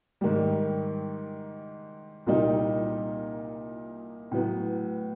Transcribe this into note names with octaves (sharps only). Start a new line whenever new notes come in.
G#2 D#3 G3
C2 A#2 G3 A#3 D#4
A2 F#3 B3